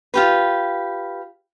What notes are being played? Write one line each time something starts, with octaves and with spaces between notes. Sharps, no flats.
F4 G4 B4